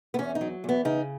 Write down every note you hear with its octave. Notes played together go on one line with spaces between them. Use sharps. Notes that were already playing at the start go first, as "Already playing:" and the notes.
B3
E2 C#4
D#4
F#3
E2 B3
C#3 D#4